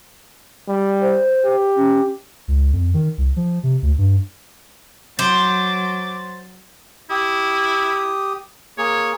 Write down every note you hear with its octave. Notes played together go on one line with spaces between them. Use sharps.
G3
C5
G4
C#4
C#2
F2
D#3
C2
F3
C3
D2
G2
F#3 C5 D6 A6
E4 G4 D#6
A#3 G#4 C#5